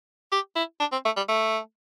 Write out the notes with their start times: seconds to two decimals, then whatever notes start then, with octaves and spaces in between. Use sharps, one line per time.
0.32 G4
0.55 E4
0.80 D4
0.92 C4
1.05 A3
1.17 G3
1.28 A3